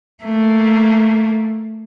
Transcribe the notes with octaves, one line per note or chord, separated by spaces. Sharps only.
A3 A#3